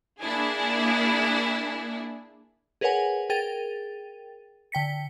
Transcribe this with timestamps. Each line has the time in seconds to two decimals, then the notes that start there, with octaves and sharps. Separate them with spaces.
0.21 A#3 D4 E4 G#4
2.81 G#4 A#4 B4 C#5 F#5 G#5
3.30 G#4 A#4 G5 A6 D#7
4.72 D3 G5 B6 C#7